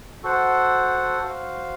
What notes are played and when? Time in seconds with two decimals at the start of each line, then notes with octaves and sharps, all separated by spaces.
0.23 F#4 A4 C5 F#5
1.21 F#4 C5 F5